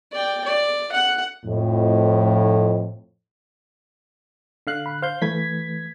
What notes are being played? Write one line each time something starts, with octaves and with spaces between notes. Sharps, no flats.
D5 G5
D5
F#5
F2 A2
D3 F5 F#6
B5
C5 F5 G6
E3 A3 B4 G#6 B6